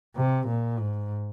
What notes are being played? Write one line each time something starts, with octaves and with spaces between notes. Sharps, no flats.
C3
A#2
G#2